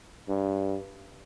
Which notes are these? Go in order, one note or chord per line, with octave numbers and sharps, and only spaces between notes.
G2